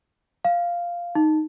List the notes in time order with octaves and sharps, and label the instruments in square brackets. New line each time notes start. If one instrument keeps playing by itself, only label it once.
[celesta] F5
D#4